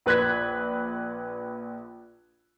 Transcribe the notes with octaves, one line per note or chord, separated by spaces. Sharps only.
A#1 B4 F#6 G#6 B6